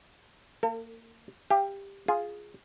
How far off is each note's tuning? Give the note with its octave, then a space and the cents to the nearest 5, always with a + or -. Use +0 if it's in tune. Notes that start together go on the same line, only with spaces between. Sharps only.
A#3 -30 A4 +45
G4 +15 F5 -30
F4 +0 G#4 +0